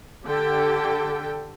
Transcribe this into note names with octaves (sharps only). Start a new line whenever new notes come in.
D3 G4 A4 G5